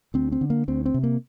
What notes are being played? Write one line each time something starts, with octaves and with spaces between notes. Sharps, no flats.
D2 C4
C4
D3
A#3
D2 C4
C4
C3
A#3